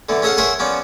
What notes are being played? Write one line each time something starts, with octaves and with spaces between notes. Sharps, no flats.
D3 E3 B3
C#4 G#4 A4 D#5 F5 F#5
A#4 C5 C#5 E5 F#5 G#5
F3 B3 C#4 D5